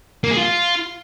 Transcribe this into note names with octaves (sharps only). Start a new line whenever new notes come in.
A#3
G#4
F4